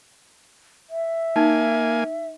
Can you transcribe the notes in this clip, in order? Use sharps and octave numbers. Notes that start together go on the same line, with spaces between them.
E5
A#3 D#4 G#5